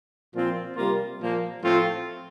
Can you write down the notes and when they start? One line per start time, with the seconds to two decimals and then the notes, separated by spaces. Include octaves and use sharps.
0.34 A#2 F3 C4 F4
0.76 C3 G3 A#3 F4
1.19 A#2 F3 A#3
1.61 A2 F3 A3 C4 F4